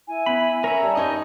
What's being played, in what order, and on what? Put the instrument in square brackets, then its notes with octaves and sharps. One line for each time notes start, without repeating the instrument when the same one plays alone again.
[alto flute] E4 [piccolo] G#5
[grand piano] B3 [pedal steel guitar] B5
[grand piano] C#4 [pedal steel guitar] A#4 C#5 E5
[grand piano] G3 A#5 [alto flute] A5
[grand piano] C#4 D#4 C#5 [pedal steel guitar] D#5